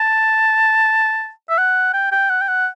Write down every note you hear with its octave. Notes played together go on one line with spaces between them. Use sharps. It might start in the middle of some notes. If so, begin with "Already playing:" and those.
Already playing: A5
E5
F#5
G5
G5
F#5
G5
F#5